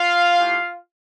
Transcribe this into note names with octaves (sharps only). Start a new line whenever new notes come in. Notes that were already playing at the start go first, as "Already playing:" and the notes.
Already playing: F4 F5
A3 E4 G4